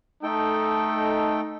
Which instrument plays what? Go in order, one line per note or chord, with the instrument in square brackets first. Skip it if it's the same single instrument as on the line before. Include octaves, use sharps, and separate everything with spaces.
[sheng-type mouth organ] A3 A4 G5 [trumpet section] D#4